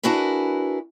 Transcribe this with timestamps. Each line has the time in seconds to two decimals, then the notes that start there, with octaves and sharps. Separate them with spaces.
0.03 D4 E4 F#4 G#4 A#4 B4